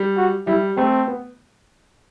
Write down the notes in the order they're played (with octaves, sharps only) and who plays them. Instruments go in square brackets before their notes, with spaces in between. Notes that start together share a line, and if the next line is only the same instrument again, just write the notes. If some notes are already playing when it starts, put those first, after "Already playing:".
Already playing: [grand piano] G3
[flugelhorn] F#4
[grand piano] G3 [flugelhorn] E4
[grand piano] A3 [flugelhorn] C4
[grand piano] B3